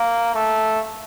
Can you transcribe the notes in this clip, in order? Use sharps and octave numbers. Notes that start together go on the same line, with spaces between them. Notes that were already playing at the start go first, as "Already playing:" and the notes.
Already playing: A#3
A3